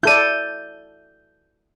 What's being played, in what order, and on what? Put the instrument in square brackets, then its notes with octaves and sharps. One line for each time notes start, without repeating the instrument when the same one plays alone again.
[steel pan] E4 A4 D5 [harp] G6 D#7